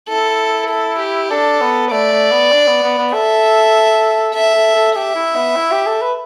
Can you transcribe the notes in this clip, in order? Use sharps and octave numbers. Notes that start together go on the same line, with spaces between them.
E4 A4
A4
G4
D4 A4
B3
A3 D5
A3
B3
D4
B3
B3
B3
A4 E5
A4 E5
A4
A4
G4 E5
E4
B3
E4
G4
A4
B4